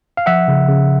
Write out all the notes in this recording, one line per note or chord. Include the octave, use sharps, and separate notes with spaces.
F5
F3 E5 F#5
C#3
C#3